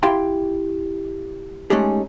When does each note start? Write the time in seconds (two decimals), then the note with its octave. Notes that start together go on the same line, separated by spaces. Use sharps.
0.03 E4 G4 F5 G5 C6
1.70 G#3 A3 C#4 D#4 G4 G#4